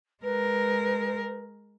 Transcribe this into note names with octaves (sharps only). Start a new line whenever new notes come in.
G#3 A#4 B4